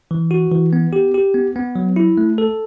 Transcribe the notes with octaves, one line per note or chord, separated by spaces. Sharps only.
E3
F#4
E3
B3
G4
G4
B3
B3
F#3
E4
A3
A4